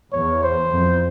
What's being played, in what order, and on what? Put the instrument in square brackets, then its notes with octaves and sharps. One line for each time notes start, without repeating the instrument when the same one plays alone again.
[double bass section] E2 [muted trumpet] C#5
[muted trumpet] C5
[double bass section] F2